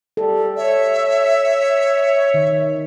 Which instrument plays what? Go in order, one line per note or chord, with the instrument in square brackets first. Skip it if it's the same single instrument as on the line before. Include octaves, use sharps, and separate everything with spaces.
[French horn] G3 [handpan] A4
[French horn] C#5 [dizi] E5
[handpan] D#3